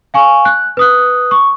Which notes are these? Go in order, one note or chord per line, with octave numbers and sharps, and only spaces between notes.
F5 G#5 C#6
F#6
B4 D#6 F#6
C#6